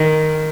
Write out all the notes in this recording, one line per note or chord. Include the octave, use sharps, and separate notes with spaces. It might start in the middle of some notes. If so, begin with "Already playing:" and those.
Already playing: D#3